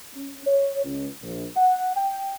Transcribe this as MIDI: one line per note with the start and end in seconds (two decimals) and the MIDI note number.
0.14 0.44 61
0.47 0.82 73
0.84 1.07 37
1.22 1.46 34
1.57 1.93 78
1.97 2.35 79